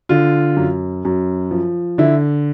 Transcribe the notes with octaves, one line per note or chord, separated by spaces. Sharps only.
D3 F4
F#2
F#2
F3
D3 E4